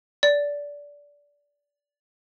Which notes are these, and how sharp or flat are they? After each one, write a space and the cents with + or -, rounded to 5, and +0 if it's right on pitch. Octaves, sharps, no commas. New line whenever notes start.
D5 -20